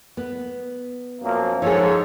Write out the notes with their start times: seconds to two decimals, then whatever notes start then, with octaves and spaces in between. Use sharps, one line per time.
0.17 B3
1.22 F#2 F3 A#3
1.62 G#2 F3 G#4 A4 C#5